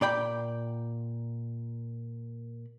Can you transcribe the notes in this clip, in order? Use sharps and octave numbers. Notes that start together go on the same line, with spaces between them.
A#2 D5 G5 B5